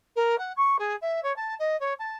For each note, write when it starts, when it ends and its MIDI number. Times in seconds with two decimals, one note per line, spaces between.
0.15 0.38 70
0.38 0.52 78
0.56 0.76 85
0.79 0.95 68
1.01 1.20 76
1.23 1.34 73
1.36 1.54 81
1.59 1.78 75
1.80 1.93 73
1.99 2.17 81